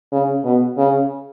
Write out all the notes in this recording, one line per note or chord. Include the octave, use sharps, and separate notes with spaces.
C#3
B2
C#3